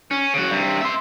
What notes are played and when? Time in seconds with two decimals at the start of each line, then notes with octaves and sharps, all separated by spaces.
0.11 C#4
0.34 C#3 F#4
0.50 G2 C3
0.81 E5 C6